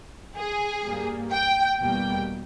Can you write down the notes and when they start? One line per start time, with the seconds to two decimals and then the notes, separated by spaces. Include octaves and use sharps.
0.37 G#4
0.84 G2 G3 A#3
1.32 G5
1.80 E2 B2 G3 A#3 G5